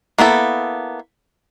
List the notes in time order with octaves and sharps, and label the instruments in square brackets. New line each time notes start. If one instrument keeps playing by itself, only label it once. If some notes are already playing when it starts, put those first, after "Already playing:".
[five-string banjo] A#3 B3 E4 A4